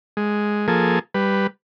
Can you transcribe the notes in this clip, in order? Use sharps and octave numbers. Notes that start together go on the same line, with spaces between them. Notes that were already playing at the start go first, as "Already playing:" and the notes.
G#3
F3 A#3 G#4 A4
G3 B4